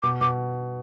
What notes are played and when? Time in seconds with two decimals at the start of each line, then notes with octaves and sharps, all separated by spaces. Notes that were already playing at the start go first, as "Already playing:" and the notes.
0.03 B2 D6
0.21 B2 D6